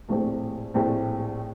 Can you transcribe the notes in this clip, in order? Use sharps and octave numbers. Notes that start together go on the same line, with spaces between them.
A#1 A2 A3 C4 G4
A#1 A2 A3 C4 G4